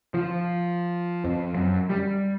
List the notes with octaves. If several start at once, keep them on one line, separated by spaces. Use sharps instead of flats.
F3
F2
F#2
G3